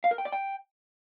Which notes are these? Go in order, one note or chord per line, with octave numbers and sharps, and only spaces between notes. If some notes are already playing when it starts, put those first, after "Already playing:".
F5
A#4
G5
D5
G5